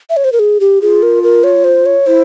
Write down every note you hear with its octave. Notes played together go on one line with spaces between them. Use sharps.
E5
C#5
C5
A#4
G#4
G4
F4 G#4
A#4
A#4
C#5
C5
C#5
E4 C5